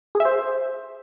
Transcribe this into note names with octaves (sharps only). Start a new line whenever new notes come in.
G#4
E5
C5